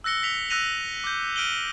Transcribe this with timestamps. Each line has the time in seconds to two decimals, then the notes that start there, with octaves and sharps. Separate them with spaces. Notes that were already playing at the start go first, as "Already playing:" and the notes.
0.04 E6 F#6 A#6 C#7 G7
0.23 B6 C#7 F7 G7
0.50 E6 F#6 A#6 D#7 F7
1.04 D6 G6
1.36 F6 D7 D#7 F#7 G7